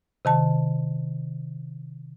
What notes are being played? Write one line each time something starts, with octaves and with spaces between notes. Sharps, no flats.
C3 D#3 A5